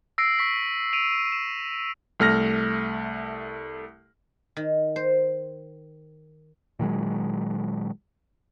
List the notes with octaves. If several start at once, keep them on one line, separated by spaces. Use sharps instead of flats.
E6 A#6 C7 D7
C#6 B6
D7 D#7 F7
E7
C2 A3 F6 A#6
D#3
C5
A#2 D#3 F#3 G#3